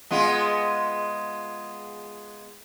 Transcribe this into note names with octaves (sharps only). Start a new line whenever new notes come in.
G#3 B3 F4